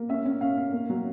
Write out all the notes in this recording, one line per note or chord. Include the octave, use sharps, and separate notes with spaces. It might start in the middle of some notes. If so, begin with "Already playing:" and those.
Already playing: A#3
C#4 E5
C#4
C#4 F5
C#4
A#3
F#3